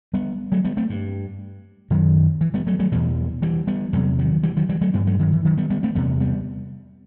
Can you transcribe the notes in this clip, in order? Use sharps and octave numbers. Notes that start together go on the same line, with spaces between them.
G3 B3
F#3 A3
G3 B3
A3 C4
G2
F#2 D#3 F#3
E3
G3 B3
F#3 A3
F#3 A3
E2 B2 E3 G3
E3 G3
G3 B3
E2 C3 F#3 A3
D#3 F#3
E3 G3
D#3 F#3
E3 G3
F#3 A3
G2 G3 B3
F#3 A3
D#3 F#3
E3
D#3 F#3
G3 B3
G3 B3
A3 C4
E2 C3 G3 B3
G3 B3